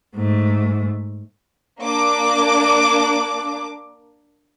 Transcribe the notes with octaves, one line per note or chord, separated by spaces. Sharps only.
G#2 A3
A#3 D4 D6